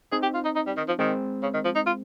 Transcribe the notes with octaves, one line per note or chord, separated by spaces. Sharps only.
C4 D#4 G#4
G4
F4
D#4
D#4
G3
D#3
F3
D#3 G#3 C4
C#3
D#3
F3
D#4
F4